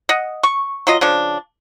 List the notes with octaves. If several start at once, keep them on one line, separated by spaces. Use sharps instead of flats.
D#5 F#5
C#6
F#3 F4 D#5
C#3 F3 D4